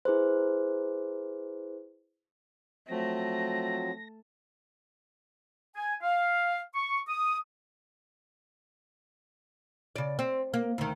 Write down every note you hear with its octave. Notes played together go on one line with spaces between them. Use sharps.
E4 G#4 B4 C5
F3 F#3 A3 C4 A#6
G#5
F5
C#6
D#6
C#3 D5
C4
A#3
D2 D#3